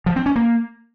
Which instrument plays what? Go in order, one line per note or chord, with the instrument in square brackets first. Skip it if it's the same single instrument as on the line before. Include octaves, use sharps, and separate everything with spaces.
[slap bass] F3
C4
C#4
A#3